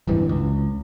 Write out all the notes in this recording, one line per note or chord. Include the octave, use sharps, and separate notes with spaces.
D1 C2 G2 E3
C#2